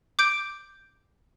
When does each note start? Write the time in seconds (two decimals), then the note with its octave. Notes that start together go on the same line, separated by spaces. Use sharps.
0.19 D6 G6 D7